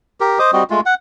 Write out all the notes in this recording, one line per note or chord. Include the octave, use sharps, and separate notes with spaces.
G4 A#4
C5 D#5 D6 D#6
G3 C4 F#4 D#5
G#3 A3 F4
F#5